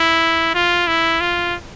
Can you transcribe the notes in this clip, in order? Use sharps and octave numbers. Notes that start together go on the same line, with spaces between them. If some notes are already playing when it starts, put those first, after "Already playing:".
Already playing: E4
F4
E4
F4